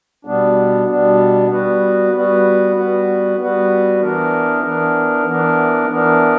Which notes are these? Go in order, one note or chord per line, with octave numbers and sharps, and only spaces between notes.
B2 G3 B3 D4
B2 G3 B3 D4
G3 B3 F#4 B4
G3 B3 F#4 B4
G3 B3 F#4 B4
G3 B3 F#4 B4
E3 B3 D4 A#4
E3 B3 D4 A#4
E3 B3 D4 A#4
E3 B3 D4 A#4